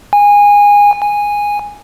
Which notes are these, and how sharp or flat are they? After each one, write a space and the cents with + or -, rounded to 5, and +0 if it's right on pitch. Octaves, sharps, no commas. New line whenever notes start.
G#5 -20
G#5 -10